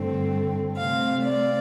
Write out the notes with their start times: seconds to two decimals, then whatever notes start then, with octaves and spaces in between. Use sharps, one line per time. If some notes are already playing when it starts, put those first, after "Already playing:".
Already playing: G2 D3 A3 C4
0.76 C3 A3 C4 F5
1.24 D5